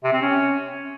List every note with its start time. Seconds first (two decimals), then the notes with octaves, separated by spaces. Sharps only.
0.04 C3
0.13 C4
0.22 C#4